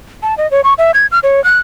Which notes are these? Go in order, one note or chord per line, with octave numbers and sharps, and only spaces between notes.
A5
D#5
C#5
C#6
E5
G#6
F6
C#5
F#6